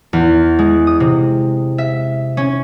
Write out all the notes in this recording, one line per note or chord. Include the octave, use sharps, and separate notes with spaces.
E2
G#3
D#6
C3
E5
C#4